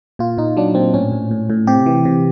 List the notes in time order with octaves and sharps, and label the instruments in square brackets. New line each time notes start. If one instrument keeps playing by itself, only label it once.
[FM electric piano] A#2 F4
A#2 D#4
F#3 D4
A#2 C4
A2 C#4
A2
A2
A2
C3 G4
E3
C3